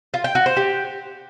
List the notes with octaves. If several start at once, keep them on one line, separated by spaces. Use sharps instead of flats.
F4
G5
F#4
C5
G4